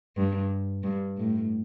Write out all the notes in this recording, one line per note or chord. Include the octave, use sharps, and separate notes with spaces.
G2
G2
A2